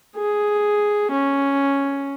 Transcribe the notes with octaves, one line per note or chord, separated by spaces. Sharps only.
G#4
C#4